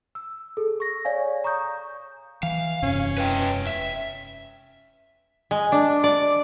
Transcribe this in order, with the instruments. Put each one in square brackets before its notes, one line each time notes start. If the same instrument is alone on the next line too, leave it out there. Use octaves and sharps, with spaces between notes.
[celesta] E6
G#4 A4
C#6 A#6
C#5 D5 F5 G#5
A#5 C#6 D#6 G6
[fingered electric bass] E3 [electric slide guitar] F5
[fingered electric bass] E1 F#2 C3 [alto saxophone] C#4
[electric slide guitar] B4 D#5 G5
E5
[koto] G#3
D4
D5